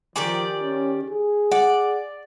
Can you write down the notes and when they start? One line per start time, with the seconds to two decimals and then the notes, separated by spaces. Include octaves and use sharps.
0.16 D#3 F3 G4 D5 G#5
0.63 C#4
1.10 G#4
1.51 D5 F#5